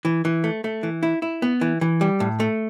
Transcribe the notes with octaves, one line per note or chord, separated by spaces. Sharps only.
E3
E3
A3
A3
E3
E4
E4
B3
E3
E3
G3
A2
A3